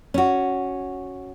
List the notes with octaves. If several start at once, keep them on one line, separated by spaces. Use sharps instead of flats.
C#4 F#4